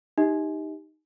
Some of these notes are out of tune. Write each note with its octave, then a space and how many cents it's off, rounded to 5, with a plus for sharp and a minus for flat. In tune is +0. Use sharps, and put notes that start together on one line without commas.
D#4 +0 G4 +10 D#5 +35